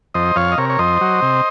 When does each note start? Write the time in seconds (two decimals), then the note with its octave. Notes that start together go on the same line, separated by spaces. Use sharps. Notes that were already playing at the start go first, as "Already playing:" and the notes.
0.14 F2 C5 D#5
0.36 F2 C#5 F5
0.52 D#5
0.58 C3 A#4 C#5
0.70 C#5
0.79 F2 C5 D#5
1.01 F#3
1.22 C3